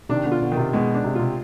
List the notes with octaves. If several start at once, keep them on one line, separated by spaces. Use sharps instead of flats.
C3 D#3 D4
B2 D3
F4
B2 D3
D#3
C3
B2 G#3
D4
C3
B2
C3 F4